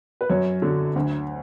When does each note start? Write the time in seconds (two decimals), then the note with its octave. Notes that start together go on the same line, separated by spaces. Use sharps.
0.21 B4
0.30 F#2 C#5
0.62 D3 F#3
0.96 D2